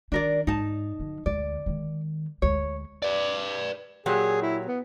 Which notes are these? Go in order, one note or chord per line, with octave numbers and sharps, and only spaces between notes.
D#3 D4 A#4 D5
G#2 D#4 A5
D3 F#3
D2 G#3 D5
D#3 G#3
D2 G#3 C#5
B4 D5
A#2 F#3 G4 G#4
E4
B3